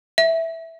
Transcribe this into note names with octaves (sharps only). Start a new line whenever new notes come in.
E5